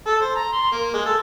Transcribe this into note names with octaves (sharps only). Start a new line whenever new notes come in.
A4
C5
A#5
C6
A#3
G#3
A4